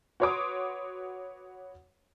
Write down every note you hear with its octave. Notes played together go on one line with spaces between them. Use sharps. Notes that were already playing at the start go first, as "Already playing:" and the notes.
F#4 B4 C#5 C6 D6 D#6